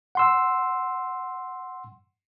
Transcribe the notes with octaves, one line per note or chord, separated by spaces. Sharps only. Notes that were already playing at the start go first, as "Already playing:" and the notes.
F#5 C6 E6